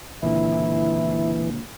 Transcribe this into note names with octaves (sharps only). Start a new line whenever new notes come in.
C#2 A#2 D3 E3 E4